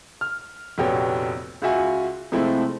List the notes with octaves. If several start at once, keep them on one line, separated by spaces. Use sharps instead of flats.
F6
F1 A#1 B3 F#4 G4 C#5
C#2 F4 F#4 E5 G#5
C3 F3 G#3 A3 C4 E4